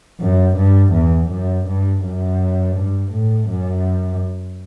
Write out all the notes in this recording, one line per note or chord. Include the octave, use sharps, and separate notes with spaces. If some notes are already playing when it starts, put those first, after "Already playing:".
F#2
G2
E2
F#2
G2
F#2
G2
A2
F#2